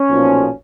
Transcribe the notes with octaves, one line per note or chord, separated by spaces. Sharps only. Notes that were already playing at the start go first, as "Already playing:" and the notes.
Already playing: C#4
B1 A#2 F3